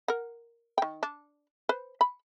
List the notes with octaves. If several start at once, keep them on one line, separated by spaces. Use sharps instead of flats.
A#4 F#5
D#3 G5
D4
B4 C5
B5